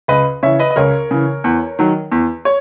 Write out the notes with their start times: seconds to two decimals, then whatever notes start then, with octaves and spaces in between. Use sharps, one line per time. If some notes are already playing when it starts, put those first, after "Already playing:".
0.08 C#2 B4 D#5
0.43 C#3 E3 C#5 E5
0.59 B4 D#5
0.70 D#5
0.76 C#2 A#4 C#5
1.11 C#3 E3
1.44 E2
1.79 D#3 F#3
2.11 E2
2.45 C#5